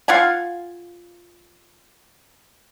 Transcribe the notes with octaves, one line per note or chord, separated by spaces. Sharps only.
F4 F5 F#5 G#5